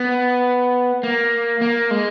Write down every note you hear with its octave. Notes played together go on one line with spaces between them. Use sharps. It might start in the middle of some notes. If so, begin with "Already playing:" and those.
Already playing: B3
A#3
A#3
G#3